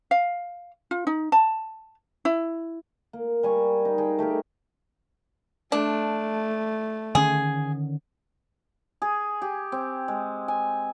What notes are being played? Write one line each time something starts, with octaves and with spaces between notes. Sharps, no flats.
F5
F4
D#4
A5
E4
A#3
G3 G#5 A#5 C#6
D#4
G#4 G5
A3 G4 G#4 A#4
A3 D4
D3 D#3 C#4 G#4
G#4
G4
C4
G#3
G#5